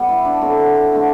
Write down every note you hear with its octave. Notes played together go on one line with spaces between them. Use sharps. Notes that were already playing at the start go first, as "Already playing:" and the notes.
Already playing: G3 B3
E4
D4
A2 F#3 A3 C4 E4
D3 A3 C4